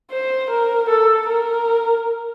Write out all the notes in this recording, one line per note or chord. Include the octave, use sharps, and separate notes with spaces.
C5
A#4
A4
A#4